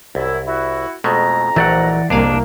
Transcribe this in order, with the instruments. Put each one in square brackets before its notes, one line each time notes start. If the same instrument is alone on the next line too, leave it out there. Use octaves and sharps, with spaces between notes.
[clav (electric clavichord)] C2 [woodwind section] F#2 E4
[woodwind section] E4 F#4
[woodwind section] F2 A#5 [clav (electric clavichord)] B2 G#3 A3
[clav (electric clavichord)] A#1 F#3 A3 [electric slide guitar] E3 D5 F#5
[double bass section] C2 A#3 [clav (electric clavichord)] F2 G#4 F5 [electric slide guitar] D4